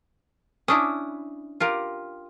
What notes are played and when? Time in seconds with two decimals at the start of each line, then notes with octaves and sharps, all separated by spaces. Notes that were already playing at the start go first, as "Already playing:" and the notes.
0.68 C#4 D4 E4 D#6
1.60 F4 G4 A#4